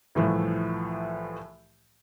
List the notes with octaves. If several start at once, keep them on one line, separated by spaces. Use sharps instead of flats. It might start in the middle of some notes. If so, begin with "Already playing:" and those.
C2 A2 E3 F3 A3